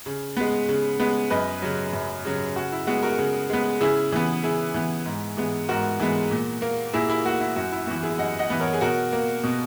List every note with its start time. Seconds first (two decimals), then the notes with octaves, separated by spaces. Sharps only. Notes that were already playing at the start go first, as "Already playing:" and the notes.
0.06 C#3
0.37 G#3 B3
0.69 C#3
1.00 G#3 B3
1.30 F#2 B4 D#5
1.62 C#3 F#3
1.93 F#2
2.25 C#3 F#3
2.56 C#3 F#4
2.72 E4
2.87 G#3 B3 F#4
3.03 F#4 A#4
3.19 C#3
3.50 G#3 B3
3.80 C#3 E4 G#4
4.12 E3 B3
4.43 C#3 E4 G#4
4.74 E3 B3
5.06 G#2
5.37 E3 G#3 B3
5.69 G#2 F#4 A#4
6.00 E3 G#3 B3
6.31 A#2
6.62 A#3
6.93 A#2 E4 G#4
7.09 E4 G#4
7.25 A#3 F#4
7.40 E4
7.56 F#2 F#4
7.72 E4
7.87 E3 B3 F#4
8.03 E4 G#4
8.18 F#2 D#5 F#5
8.39 D#5 F#5
8.50 E3 B3
8.60 A#4 C#5
8.74 G#4
8.81 B2 F#4 A#4
9.12 A#3
9.44 B2